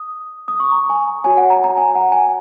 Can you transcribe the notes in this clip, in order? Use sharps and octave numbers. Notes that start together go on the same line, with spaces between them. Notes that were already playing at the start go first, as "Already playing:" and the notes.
Already playing: D#6
D#6
C#6
A#5
G#5
F#4 C#5 G#5
F#5
A#5
A#5
G#5
F#5
G#5